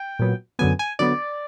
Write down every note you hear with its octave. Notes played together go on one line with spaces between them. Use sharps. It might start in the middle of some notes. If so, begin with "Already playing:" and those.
Already playing: G5
A#2 F#3 B3
F#2 D3 F#3 B3 G#5
G#5
D3 F#3 B3 D5